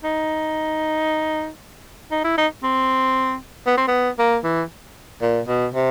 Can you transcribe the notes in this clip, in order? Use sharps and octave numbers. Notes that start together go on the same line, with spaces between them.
D#4
D#4
E4
D#4
C4
B3
C4
B3
A#3
E3
A#2
B2
C3